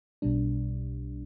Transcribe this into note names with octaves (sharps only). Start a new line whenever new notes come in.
B1 B2 G3 D4